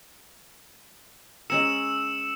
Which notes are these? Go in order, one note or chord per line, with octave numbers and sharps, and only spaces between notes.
G#3 C#4 A#4 E6 C#7 E7